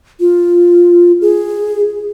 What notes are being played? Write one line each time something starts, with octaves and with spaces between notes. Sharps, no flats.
F4
G#4